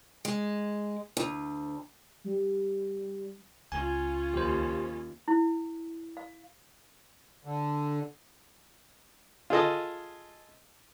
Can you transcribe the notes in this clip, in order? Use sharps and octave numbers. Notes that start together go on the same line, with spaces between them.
G#3
D2
G3
C#2 C#4 F4 G#5
D#2 G4 C5
E4
F5
D3
F4 G#4 A4 D#5